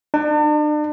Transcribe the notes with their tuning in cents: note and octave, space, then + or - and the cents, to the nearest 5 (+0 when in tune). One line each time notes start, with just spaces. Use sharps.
D4 +40